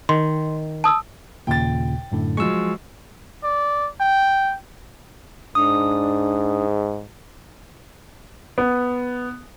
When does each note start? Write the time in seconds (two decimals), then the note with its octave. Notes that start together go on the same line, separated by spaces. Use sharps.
0.09 D#3 C6
0.84 A5 D#6 E6
1.47 D#2 A#2 C#3 G5 A6
2.12 F#2 A2 D3
2.37 F3 F#3 G#3 C#6 E6
3.44 D5
4.00 G5
5.55 G#2 D4 D#6
8.58 B3